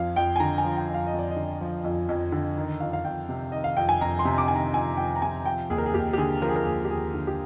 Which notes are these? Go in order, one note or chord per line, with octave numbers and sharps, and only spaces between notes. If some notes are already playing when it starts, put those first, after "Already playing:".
Already playing: F2 F3 F5
F2 G5
G#5
D3 A#5
G#5
F3
G5
F2
F5
D#5
F2
D5
D#5
D3
F3
F2
F2
D3
D#3
F2 F5
F5
F2 G5
C3
D#3 D#5
F5
F2 G5
G#5
F2 A#5
C6
C3
D6
D#3 G#5
A#5
F2 G#5
F2 G5
A#5
C3 G#5
F3 G5
D#2 G#4
A#4
G#4
D#2 G4
G4
D3 G#4
F3 A#4
G#4
A#4
D#2 G#4
G4
D#2 G#4
D3
G4